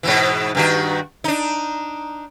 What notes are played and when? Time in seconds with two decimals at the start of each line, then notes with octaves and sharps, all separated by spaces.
0.03 G#2 B2 E3
0.55 G2 D#3 F#4
1.24 D4 D#4